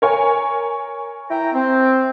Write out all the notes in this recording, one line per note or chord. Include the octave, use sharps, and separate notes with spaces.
A#4 C#5 G#5
E4 G5 A#5
C4